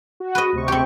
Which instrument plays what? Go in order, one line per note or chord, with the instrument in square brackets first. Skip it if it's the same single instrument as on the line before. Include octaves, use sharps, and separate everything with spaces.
[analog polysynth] F#4
[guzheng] B4 D#5
[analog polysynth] D2 C3 C#6
[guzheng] C4 G4